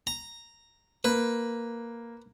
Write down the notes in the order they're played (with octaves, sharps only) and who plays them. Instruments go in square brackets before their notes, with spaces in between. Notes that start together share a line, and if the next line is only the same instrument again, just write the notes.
[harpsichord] A#5
[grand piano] A#3 [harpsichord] B4